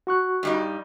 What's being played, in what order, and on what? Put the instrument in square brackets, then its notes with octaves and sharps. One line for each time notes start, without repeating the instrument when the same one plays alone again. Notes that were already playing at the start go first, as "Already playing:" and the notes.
[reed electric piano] F#4 C#6 F#6
[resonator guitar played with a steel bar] G2 G3 D#4